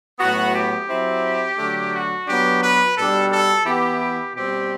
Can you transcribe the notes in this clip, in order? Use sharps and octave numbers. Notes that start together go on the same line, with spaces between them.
A2 F#3 B3 F#4
G4
F#3 C4 E4
D3 F#3 A3 D4
F#4
F#3 B3 D4 G4
B4
B2 G3 D4 A4
A4
E3 B3 E4 G4
G4
B2 G3 C4 G4